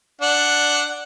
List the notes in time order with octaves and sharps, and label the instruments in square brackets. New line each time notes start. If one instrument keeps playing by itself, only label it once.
[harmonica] D4 F#5